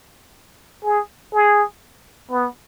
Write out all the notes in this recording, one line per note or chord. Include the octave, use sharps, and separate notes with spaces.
G#4
G#4
B3